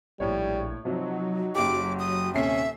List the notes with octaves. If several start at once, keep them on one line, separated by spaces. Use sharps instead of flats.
A#1 A2 G3 C#5
C3 F3 F#3 D#4
F#1 G4 D6
D#6
D#1 C3 C#4 E5 C7